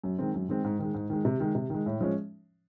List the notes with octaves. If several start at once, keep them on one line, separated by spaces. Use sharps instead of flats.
F#2
D#3 G#3 C4
F#2
D#3 G#3 C4
G#2
D#3 G#3
G#2
D#3 G#3
C3
D#3 G#3
C3
D#3 G#3
A2
F3 G#3 C#4